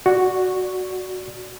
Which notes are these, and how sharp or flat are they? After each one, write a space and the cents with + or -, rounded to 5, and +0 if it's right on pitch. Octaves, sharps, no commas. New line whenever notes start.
F#4 +0 D5 +0 C#6 +0